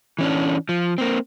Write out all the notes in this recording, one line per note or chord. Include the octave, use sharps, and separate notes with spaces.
E3 C#4 D4
F3
A#3 C4